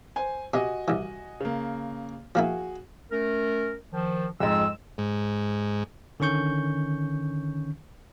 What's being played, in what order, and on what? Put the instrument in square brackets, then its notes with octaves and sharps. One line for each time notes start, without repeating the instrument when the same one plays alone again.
[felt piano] C5 G#5
[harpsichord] C3 [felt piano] F#4 D#5 G#5
[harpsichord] C2 E3
[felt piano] C#3 A#3
[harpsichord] F3 A#3 E4 [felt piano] F#4 G#4
[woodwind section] A3 C#4 A#4
D#3 F3
[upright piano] F2 G#2 [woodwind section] E6
[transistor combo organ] G#2
[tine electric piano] D3 D#3 C#4 C#6 G6